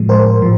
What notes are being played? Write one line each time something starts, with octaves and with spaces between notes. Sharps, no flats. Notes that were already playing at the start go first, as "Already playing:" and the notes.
Already playing: A2 F3 G#3
A#4 C5
A2 F3